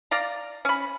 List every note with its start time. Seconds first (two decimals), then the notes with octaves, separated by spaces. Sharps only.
0.11 D5 F5 A#5
0.65 C#4 B5